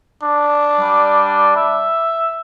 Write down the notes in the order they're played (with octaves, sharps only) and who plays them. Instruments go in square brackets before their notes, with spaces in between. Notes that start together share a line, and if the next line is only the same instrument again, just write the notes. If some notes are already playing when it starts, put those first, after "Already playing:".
[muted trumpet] D4
[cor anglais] G3
E5